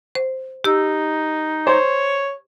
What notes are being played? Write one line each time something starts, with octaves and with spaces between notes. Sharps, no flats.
C5
D#4 G4 E6
C5 C#5